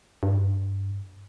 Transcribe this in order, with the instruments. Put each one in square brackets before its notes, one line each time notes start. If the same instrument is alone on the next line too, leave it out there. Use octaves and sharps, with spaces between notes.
[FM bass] G2